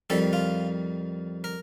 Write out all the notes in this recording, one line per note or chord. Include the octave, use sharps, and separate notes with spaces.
F2 D#3 G3 A4
F4
A#4